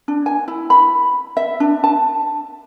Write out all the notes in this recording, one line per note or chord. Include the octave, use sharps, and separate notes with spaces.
D4
G#5
E4
B5
E5
D4
A5